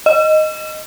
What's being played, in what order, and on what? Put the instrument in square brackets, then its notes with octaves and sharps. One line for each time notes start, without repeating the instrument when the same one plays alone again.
[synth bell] D#5